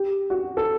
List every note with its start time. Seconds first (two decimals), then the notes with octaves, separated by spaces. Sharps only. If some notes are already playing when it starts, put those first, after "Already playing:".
Already playing: G4
0.30 F#4
0.57 A4